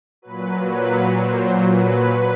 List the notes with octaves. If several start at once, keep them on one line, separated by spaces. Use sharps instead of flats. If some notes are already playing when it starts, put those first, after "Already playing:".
A#2 F#3 B4
B4
C5
B4